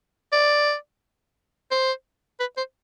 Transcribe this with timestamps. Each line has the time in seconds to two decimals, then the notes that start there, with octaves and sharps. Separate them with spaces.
0.32 D5
1.71 C5
2.40 B4
2.57 C5